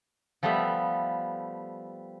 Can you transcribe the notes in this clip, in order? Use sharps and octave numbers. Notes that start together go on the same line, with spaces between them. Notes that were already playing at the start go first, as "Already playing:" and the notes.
F3 G3 A3 B3 E5